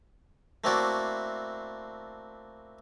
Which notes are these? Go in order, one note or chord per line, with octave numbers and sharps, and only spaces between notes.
A3 A#3 C4 E4 F#4 D5